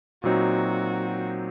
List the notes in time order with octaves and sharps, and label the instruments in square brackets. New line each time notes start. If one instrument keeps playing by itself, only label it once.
[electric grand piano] A#2 F#3 C4 D#4 [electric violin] F#4